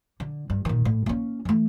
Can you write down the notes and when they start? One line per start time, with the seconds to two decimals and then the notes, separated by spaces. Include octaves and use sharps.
0.20 D3
0.50 G2
0.65 A#2 D#3
0.85 A2
1.06 A#3 C#4
1.45 E3 A3